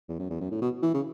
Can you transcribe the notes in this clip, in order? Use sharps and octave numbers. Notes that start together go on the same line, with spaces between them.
E2
F#2
E2
F#2
A2
B2
E3
C#3